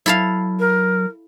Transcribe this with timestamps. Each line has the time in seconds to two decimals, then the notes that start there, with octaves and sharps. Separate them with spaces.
0.06 F#3 E4 A4 F5
0.59 A#4